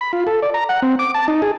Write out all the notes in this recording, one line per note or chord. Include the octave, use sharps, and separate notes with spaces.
B5
F4
A4
D5
A#5
F#5
C4
D6
A5
D#4
G#4